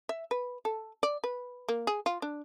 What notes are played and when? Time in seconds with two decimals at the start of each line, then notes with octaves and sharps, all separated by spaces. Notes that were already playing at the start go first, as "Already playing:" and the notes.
0.09 E5
0.31 B4
0.65 A4
1.03 D5
1.24 B4
1.69 A#3
1.87 G#4
2.06 F4
2.22 D4